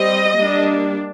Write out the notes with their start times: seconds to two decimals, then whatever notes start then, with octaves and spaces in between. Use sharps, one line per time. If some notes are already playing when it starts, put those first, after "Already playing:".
Already playing: G3 C4 D#5
0.38 G3 A#3 D4